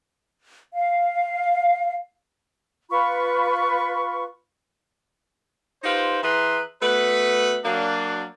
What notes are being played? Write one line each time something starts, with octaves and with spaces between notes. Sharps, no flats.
F5
F4 B4 B5 C#6
D#4 F4 G4 B4 C5
E3 G#4 B4 E5 A#5 C6
A3 B3 F#4 B4
F#3 A#3 D4